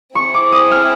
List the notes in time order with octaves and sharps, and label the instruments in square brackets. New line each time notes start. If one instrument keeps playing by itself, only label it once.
[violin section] C4 E4 G#4 [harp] C#6
[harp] D6
D#6
F6